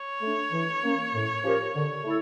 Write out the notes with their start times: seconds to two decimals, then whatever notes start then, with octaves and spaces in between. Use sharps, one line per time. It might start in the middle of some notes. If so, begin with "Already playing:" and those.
Already playing: C#5
0.22 A3 D4
0.52 E3
0.83 A#3 C#4
1.14 A2
1.44 F3 C#4 G4 A#4
1.75 D3
2.04 A3 E4 A4